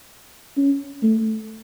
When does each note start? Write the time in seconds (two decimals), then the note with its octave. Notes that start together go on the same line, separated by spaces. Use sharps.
0.57 C#4
1.03 A3